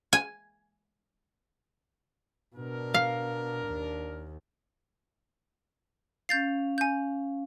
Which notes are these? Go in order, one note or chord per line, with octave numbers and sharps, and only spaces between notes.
G#5
B2 D4 A#4
F5
D#2
C#4 F5 G6 A6 C7
G#5 G6